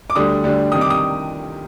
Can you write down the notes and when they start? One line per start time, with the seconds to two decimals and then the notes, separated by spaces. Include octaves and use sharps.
0.10 D6
0.15 D2 D3 G3 D4 D#6
0.43 D2 D3 G3 D4
0.72 C3 D#3 G3 D#6
0.81 D6
0.90 D#6